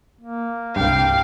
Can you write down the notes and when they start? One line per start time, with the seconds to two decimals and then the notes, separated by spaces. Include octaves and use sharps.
0.21 A#3
0.76 C2 G2 F5 G5